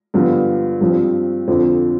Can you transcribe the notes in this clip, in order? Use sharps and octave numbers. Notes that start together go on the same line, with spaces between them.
G2 D3 F3 B3 F4
G2 F3 C4
F2 D3 F3 C4